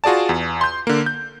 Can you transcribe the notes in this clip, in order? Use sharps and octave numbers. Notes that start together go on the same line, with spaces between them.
F4 F#4 G#4 D5 A5
E2
C6 G6
D3 A#3
G6